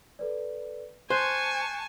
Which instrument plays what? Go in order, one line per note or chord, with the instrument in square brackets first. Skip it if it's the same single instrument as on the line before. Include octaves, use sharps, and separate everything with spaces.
[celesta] A4 B4 D5
[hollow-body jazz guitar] C5 [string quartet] G#5 A5 C#6 [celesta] F#6 G6 C7